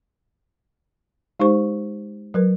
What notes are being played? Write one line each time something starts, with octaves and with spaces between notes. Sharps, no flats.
G#3 D#4 G4 C5 C#6
F#3 A#4 B4